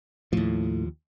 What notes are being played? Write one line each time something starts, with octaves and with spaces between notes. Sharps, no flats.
D#2 A2 F3